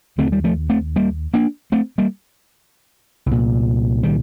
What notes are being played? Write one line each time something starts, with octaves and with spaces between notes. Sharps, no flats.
D#2 D3 A3 C4
G3
F3 A3
A3 C4
G3 A#3
A#3 D4
A3 C4
G3 A#3
C2
A#2
D#3 G3